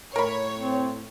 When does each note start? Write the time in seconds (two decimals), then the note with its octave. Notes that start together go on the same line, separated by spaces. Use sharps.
0.16 A2 A#4 C#5 B5
0.60 C4